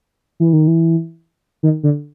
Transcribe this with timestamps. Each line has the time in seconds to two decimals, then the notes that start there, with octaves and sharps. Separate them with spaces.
0.40 E3
0.53 D#3
0.67 E3
1.63 D#3
1.83 D3